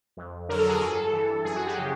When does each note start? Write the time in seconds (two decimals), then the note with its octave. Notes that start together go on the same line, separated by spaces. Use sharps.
0.17 F2
0.49 D3 F#3 A#4
0.59 A4
0.69 G#4
0.80 G2 A4
1.13 E3
1.44 F#2 G#4
1.56 F#4
1.66 G4
1.77 C#3 F3